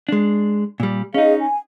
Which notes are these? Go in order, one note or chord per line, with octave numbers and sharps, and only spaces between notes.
G#3 D4
A#2 G3
C#4 D#4 G#4 D#5 F5
G#5